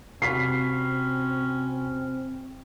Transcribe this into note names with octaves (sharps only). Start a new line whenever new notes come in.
C3 C4 C#4 F#4 B5 B6 C7